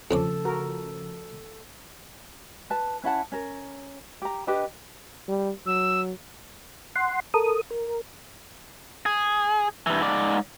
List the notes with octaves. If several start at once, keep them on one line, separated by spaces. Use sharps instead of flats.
F2 C#3 F3 C#4 A4 D6
F#4 A#4
B4 A5
C#4 E4 F#5 A5
C#4 A#4
G4 A#5
D4 G4 B4 D#5
G3
F#3 E6
F#5 C6
A4 A#4 D#6
A#4
G#4
G2 E3
G#2 D5